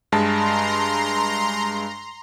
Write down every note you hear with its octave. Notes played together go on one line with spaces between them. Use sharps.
G2 G#3 A5 A#5 C6